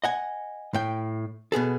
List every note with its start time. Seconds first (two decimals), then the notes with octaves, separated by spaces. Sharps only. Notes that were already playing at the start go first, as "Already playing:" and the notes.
0.04 D#5 F#5 G#5
0.74 A2 G5
1.52 B2 B3 G#4 A4